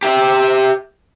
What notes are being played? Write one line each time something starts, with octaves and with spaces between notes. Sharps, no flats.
G4 E5